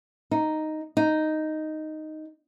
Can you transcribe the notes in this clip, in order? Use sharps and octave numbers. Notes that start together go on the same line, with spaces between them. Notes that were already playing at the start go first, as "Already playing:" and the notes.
D#4
D#4